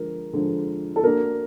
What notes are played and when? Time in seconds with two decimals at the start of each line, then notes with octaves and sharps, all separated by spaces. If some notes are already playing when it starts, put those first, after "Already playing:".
Already playing: D3 F3 G#3 A#4
0.33 D3 F3 G#3
0.96 A4
1.04 A#3 D4 F#4 A#4